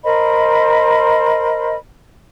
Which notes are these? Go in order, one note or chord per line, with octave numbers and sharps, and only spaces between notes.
A#4 C5 D#5 B5